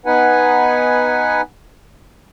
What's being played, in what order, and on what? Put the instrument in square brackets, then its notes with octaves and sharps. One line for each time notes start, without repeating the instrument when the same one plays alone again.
[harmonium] B3 D#4 B4 F#5 G#5